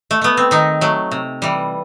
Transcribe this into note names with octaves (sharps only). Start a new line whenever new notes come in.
A3
A3 B3
C4
D#3 D#4
F#3 A3
C3
E3 G3